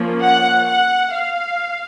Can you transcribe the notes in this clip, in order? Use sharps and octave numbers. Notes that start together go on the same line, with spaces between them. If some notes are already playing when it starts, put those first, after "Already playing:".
Already playing: F3 A#3 C#4
F#5
F#5
F5